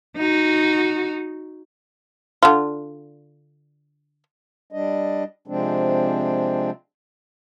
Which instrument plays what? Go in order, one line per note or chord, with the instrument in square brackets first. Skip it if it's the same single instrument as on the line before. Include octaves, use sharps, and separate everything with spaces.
[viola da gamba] D#4 F#4
[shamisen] D3 D4 F4
[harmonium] G3 D4 D#5
C3 F3 G#3 C4 D4